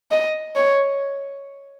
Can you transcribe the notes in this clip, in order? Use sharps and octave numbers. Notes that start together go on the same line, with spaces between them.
D#5
C#5